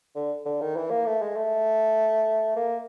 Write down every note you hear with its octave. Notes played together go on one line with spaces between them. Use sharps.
D3
D3
D#3
E3
A#3
A3
G#3
A3
A#3